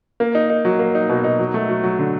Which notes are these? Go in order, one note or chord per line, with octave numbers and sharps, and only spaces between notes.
A#3
D#4
D#4
F#3
A#3
D#4
B2
D#4
F#3
A3
F#3
F#3
D3